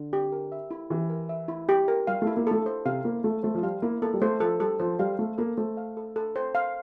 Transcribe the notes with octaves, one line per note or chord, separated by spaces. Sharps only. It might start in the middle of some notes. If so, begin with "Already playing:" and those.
Already playing: D3
G4
A#4
E5
E4
E3 G4
A#4
E5
E4
G4
A#4
G3 F5
A3
E4
A#3
A3 A4
C5
C3 F5
A#3 E4
A3 A4
A3 C5
F3
G3 F5
A#3 E4
A#3 A4
G3
A3 C5
F3 A4
G3 A4
F3 C5
G3 F5
A3 A4
A#3 A4
A3 C5
F5
A4
A4
C5
F5